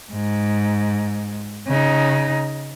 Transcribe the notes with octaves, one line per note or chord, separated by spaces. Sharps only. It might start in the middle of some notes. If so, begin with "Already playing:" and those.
G#2
C#3 D#4